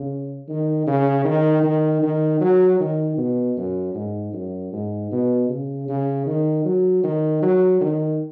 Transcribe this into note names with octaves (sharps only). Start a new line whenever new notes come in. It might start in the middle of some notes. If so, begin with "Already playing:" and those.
Already playing: C#3
D#3
C#3
D#3
D#3
D#3
F#3
D#3
B2
F#2
G#2
F#2
G#2
B2
C#3
C#3
D#3
F#3
D#3
F#3
D#3